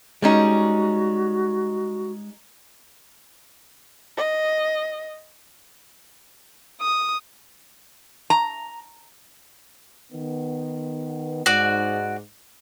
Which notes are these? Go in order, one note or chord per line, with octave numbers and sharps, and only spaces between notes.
G3 G#3 C#4 D#4 F#4
D#5
D#6
A#5
D#3 B3
G#2 F#4 D5